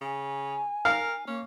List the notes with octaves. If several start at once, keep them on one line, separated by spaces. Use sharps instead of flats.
C#3 G#5
A#4 F5
A#3 C#4